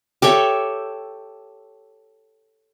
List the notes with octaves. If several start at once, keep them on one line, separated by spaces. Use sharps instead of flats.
G4 A4 C#5 E5